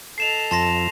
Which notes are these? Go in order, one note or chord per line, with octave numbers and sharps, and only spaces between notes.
A4 D#5 C7 E7 F7
F2 A5 C6 A#6